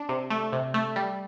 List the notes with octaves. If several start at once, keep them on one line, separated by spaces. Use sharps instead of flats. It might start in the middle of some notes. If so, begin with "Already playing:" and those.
Already playing: D4
C3
A3
C3
A3
G3